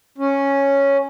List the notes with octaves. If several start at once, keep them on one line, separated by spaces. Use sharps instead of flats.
C#4